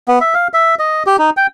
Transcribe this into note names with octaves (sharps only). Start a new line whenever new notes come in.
B3
E5
F5
E5
D#5
G4
D#4
G5